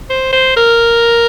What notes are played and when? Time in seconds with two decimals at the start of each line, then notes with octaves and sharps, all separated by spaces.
0.10 C5
0.33 C5
0.56 A#4